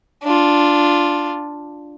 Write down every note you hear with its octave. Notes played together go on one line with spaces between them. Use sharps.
D4 F4